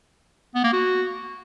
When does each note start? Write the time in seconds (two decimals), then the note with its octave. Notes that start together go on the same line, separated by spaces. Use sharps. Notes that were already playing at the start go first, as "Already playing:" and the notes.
0.55 B3
0.64 A#3
0.73 F#4